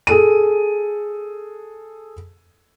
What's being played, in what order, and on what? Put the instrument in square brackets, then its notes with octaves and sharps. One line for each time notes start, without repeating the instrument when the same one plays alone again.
[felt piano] G#4 A4 D#7